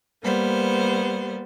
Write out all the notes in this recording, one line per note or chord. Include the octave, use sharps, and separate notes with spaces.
G3 A#3 B3 C5